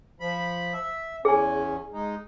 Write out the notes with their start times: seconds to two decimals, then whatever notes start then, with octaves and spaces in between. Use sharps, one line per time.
0.20 F3 B5
0.73 E5
1.25 E2 C#4 G#4 G#5
1.93 G#3 D#4